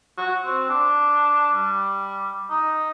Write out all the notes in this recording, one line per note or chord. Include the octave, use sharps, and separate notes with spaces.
F#4
C4
D4
G3
D#4